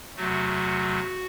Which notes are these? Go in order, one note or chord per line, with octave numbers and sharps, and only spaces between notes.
E2 C3 F#3 A3 F#4